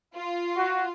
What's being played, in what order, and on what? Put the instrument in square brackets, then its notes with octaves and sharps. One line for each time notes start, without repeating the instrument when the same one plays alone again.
[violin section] F4
[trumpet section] F#4